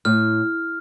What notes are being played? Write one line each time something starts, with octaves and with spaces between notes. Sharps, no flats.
A2 F6